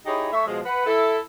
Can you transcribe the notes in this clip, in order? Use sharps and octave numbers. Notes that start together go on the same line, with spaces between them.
D#4 E4 G4 G#4 C#5
A3 C#5 E5
B2 F3 G#3
B4 F#5
E4 A4